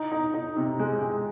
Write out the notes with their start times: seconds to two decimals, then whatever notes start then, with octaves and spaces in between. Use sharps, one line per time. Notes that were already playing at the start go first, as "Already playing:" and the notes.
Already playing: D#4
0.12 D#4
0.34 D#4
0.57 C3
0.80 G#3
1.02 G#3